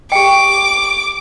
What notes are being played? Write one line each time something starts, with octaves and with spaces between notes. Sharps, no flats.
G4 G5 D6